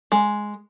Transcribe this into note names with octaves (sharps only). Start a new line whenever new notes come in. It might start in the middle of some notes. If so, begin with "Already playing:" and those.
G#3